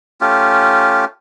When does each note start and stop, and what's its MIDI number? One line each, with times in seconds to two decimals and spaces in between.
0.21 1.05 57
0.21 1.05 61
0.21 1.05 65
0.21 1.05 67